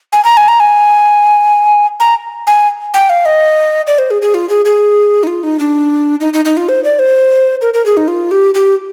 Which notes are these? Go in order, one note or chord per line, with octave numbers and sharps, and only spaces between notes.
G#5
A#5
G#5
A#5
G#5
A#5
G#5
G5
F5
D#5
D5
C5
G#4
G#4
F4
G#4
G#4
D#4
F4
D#4
D4
D#4
D#4
D#4
F4
C5
D5
C5
A#4
A#4
G#4
D#4
F4
G4
G4